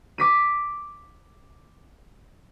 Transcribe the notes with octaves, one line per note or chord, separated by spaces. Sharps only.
D6 B6 D#7